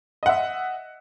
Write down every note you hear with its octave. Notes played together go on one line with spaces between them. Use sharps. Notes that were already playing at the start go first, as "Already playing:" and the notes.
D#5 E5 F#5